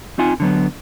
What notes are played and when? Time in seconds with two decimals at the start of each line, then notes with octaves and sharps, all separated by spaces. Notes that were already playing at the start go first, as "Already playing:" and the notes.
0.18 C4 D#4 F4 G#5
0.40 D3 F#3 B3